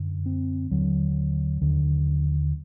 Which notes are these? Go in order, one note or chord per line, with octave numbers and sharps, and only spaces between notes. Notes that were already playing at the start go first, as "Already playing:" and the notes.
Already playing: F#2 D3
C4
D#2 D3 F#3
D#2 D3